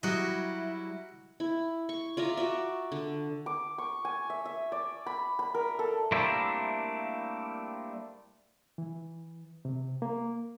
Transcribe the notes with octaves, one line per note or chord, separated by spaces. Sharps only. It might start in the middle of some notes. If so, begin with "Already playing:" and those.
F#3 G3 E4 F#4 D#5
E4
C#6
F4 D5 E5 A#5
F#4 D5 E5
D3
D6
C#6
G#5
E5
E5
D5
B5
B5
A#4
A4
G3 A3 A#3 C4 D4 E4
E3
C3
A#3